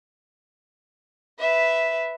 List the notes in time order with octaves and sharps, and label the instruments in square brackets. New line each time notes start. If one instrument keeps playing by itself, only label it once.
[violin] B4 E5